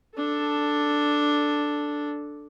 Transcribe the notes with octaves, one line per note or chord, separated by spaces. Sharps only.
D4 A4